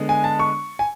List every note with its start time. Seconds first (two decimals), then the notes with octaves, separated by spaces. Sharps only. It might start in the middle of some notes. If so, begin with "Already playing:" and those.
Already playing: D3 G#3 B3
0.09 G#5
0.24 A5
0.39 C#6
0.79 G#5